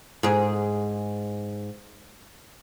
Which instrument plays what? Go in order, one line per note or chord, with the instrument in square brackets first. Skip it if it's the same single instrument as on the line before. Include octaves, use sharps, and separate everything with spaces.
[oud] G#2 G#4